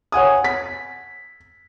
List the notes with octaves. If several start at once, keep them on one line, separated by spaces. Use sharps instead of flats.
C#5 F#5 G#5 D#6
B6